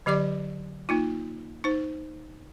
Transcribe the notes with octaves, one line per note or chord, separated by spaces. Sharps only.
D3 F#3 G4 D5 D6
A#3 D#4 F4
D#4 C5